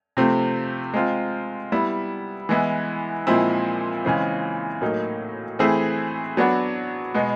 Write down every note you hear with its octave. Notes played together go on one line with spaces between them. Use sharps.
C3 F3 A3 C4
G#3 C4 F4
G3 B3 E4
E3 G#3 B3 E4
A#2 F3 G#3 C4 E4
C#3 E3 G#3 C4
A2 F#3 A#3 D#4
E3 A3 C4 E4 G#4
F#3 B3 D4 F#4
B2 G#3 B3